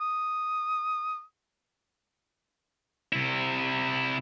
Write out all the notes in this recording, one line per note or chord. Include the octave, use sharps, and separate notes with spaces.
D#6
C3 E4